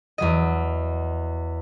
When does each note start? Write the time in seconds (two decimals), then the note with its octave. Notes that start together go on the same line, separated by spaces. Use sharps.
0.18 E2 F#3 D#5